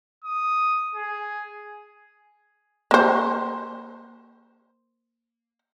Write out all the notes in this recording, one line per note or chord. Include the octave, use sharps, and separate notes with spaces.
D#6
G#4
A#3 C5